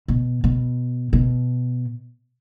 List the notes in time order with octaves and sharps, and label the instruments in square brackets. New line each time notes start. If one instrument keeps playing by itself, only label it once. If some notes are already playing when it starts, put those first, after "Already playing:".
[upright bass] B2
B2
B2